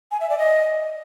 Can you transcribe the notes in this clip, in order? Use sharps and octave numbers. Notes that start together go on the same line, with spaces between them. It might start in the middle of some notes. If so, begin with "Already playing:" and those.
G#5
E5
D5
D#5